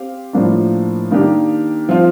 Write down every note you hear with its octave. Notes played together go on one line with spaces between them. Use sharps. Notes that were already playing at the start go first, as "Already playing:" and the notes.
Already playing: C4 G4 F5
A2 F3 A#3 D4
D#3 A#3 D4 G4
F3 C4 F4